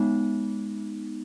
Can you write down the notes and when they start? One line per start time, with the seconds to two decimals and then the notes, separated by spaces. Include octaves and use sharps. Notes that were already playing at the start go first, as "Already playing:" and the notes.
Already playing: G#3 B3 D#4